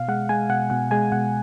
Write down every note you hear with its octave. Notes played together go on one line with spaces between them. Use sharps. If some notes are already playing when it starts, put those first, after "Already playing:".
Already playing: B2 F5
G#3 F#5
G#3 G#5
B2 F#5
B2 F#5
G#3 G#5
B2 F#5